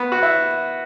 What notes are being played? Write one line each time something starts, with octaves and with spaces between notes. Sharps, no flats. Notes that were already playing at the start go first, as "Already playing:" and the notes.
Already playing: B3
F#4
E4